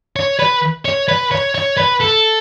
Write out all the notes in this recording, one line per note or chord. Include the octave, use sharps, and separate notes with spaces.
C#5
B4
C#5
B4
C#5
C#5
B4
A4